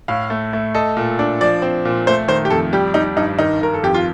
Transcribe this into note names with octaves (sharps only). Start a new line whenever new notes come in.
A2 F5
A3
A3
A4 D#5
A#2
D4
F3 D5
C4
A#2
A3 C5
D#3 C5
G4
F2 A4
G3 G4
G3 D#4
G2 D#4
D#3 D#4
D#3 A#4
A4
F2 G4
F4